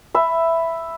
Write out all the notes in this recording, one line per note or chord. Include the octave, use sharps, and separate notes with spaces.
E5 B5